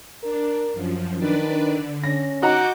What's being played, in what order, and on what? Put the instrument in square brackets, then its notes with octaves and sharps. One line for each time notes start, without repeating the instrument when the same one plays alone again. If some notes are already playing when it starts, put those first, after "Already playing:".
[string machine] D4 [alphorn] A#4
[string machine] F#2 F3
[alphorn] D#3 [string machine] D4 B4 D5
[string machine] D3
[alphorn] C#4 [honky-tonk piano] A#6
[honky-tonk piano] D#4 F#5 A#5 [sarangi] F#4 [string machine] D6 G6